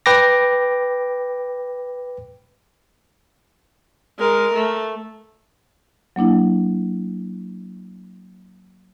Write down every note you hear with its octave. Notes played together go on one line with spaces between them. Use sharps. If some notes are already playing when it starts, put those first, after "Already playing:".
B4 G5 D6 A#6
G#3 A#4
A3
F#3 A#3 D4 E4